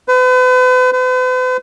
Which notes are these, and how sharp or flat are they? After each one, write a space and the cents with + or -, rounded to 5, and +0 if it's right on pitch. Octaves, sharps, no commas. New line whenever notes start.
B4 +40
B4 +45